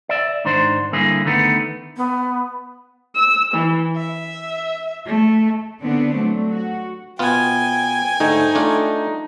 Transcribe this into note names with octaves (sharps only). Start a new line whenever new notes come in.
D5 E5
G#2 D#3 D4 C5
G2 D3 A#3 E4 G#4
D3 D#3 A3 B3
B3
E6
E3
E5
A3
D3 B3 C4 D4
F#3 A3
F#4
B2 B3 F4 G5 G#5
G#2 D3 A3 D#4
A3 D4 F4